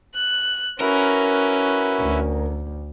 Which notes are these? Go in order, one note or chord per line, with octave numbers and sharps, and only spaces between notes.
F#6
C#4 E4 F#4 A#4 B4
D2